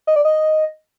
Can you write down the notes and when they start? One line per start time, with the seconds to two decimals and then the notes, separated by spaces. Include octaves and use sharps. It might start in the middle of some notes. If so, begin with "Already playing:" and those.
0.07 D#5
0.16 D5
0.25 D#5